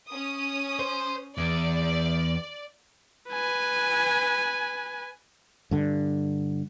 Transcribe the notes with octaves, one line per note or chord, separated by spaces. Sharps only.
C#4 D#6
C5
E2 D5
B4 G#5
G2 D3